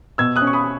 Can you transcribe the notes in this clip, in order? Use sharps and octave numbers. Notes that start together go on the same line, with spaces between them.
B2 E6 G#6
D#6 F#6
C#4
C#6
B5 D#6